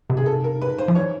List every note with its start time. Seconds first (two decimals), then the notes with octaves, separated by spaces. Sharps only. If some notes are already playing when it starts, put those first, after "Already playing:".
0.10 C3
0.17 G#4
0.26 A4
0.44 A#4
0.62 B4
0.78 C5
0.88 F3
0.95 E3 C#5